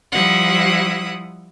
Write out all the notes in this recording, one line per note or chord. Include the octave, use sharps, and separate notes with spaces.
F3 G3 E4 F#5 D#6